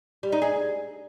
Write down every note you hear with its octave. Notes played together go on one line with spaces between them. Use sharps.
G3
D#4
G#4